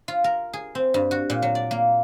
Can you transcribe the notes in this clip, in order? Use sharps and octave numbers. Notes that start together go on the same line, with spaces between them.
F4
A#4
G#4
C4
G2
F#4
A#2
F#3
D5
A#3